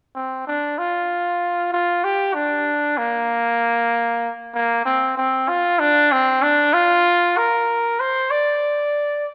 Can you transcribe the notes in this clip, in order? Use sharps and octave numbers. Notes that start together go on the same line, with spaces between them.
C4
D4
F4
F4
G4
D4
A#3
A#3
C4
C4
F4
D4
C4
D4
F4
A#4
C5
D5